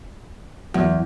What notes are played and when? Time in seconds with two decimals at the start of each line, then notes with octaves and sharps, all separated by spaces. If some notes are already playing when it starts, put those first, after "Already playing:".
0.74 E2 F#3